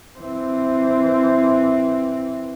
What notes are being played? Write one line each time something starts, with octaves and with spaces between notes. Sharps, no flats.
E3 C4